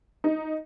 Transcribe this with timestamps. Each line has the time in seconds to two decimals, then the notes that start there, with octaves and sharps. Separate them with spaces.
0.24 D#4